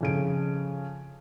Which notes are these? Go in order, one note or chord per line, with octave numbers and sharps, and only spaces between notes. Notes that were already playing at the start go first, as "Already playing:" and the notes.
F2 C#3 D7